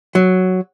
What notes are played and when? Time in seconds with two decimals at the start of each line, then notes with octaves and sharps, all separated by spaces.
0.15 F#3